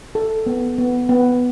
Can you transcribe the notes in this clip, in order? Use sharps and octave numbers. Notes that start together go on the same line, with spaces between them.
A4
B3
B3
B3